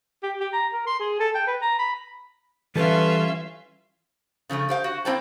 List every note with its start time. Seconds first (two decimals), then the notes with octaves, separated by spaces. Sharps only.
0.23 G4
0.40 G4
0.53 A#5
0.73 A#4
0.87 C6
0.99 G#4
1.20 A4
1.35 G5
1.47 B4
1.62 A#5
1.79 B5
2.76 E3 G3 C#4 F4 A4 B4 E5
4.49 C#3 F3 G#3 A3
4.69 G4 C5 F5
4.84 F#4
5.05 A#3 C4 E4 C5 G5 A5